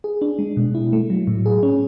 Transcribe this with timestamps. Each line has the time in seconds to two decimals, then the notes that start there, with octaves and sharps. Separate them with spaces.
0.04 G#4
0.22 D4
0.39 G#3
0.57 B2
0.75 E4
0.93 A3
1.10 F#3
1.27 A2
1.46 G#4
1.63 C#4